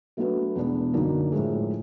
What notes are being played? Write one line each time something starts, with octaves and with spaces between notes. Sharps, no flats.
F#3 A3 D4 F#4 B4
E2 B2 G#3 B3 D4
F#2 D3 F#3 A#3 D#4
A2 F3 G#3